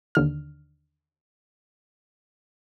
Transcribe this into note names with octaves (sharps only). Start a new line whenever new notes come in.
D#2 D3 F6